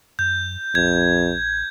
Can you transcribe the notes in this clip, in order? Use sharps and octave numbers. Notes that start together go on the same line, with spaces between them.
F#2 G6
A#1 F2 G#6